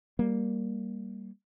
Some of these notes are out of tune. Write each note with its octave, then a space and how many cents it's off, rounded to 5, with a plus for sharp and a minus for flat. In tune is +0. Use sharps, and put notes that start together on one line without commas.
G3 +0 A#3 +0